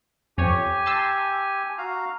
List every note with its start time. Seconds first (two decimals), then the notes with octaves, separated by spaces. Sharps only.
0.38 F2 G4 C#5 G#5
0.86 A5 C6 E6
1.78 F#4 F5 A#5